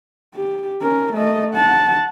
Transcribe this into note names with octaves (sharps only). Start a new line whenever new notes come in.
G4
C#4 A#4
A3 D#5
F#5 A5